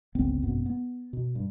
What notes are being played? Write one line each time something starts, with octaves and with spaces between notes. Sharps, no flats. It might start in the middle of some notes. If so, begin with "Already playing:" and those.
G1 C#2 B3 C4
G#1 F#2 B2 B3
B3
B2
G2